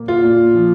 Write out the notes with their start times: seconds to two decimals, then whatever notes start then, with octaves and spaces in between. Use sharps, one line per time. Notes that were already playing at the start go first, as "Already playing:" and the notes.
Already playing: A#2 A#3
0.08 F4
0.24 A#2
0.55 F3